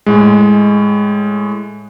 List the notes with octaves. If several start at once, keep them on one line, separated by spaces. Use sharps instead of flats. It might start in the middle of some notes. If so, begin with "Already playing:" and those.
A2 G#3